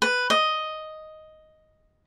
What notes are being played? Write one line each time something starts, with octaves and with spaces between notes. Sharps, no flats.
B4
D#5